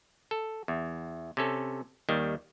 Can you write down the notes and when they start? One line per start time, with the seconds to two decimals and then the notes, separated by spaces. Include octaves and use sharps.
0.31 A4
0.68 E2
1.37 C3 C#4 A4
2.09 D#2 D#3 G3